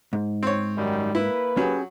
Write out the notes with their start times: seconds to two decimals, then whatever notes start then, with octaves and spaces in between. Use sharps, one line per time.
0.13 G#2
0.43 C4 C#5
0.77 F#2 D#3 G3
1.15 A#3 E4 B4
1.57 F#3 C#4 G4 G#4